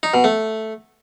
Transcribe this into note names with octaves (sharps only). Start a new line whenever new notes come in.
D#4
B2
A3